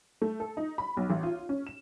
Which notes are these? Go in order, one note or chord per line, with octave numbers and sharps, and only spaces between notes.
A3
A4
D#4
B5
B1
A1
F4
C#4
E7